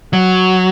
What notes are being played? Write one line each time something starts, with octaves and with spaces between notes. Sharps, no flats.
F#3